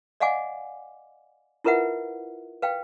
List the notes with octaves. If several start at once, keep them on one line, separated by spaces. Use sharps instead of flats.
D5 D#5 F5 F#5 G#5 D6
E4 F4 A#4 B4 E5 F#5
B4 F5 G5